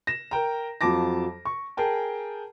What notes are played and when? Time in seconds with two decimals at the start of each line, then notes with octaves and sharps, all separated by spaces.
0.07 A#6 E7
0.31 A#4 G5 A#5
0.81 F2 F3 F#3 A5 D6 A#6
1.45 C#6
1.77 G#4 A#4 G5 A5